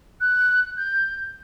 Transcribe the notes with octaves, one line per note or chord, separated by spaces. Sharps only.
F#6
G6